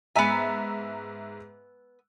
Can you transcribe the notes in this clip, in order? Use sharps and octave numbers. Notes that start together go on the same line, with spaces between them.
G#2 B3 E5 G#5 A#5